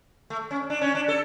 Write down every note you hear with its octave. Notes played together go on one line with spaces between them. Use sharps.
A3
C#4
D4
C#4
D4
A4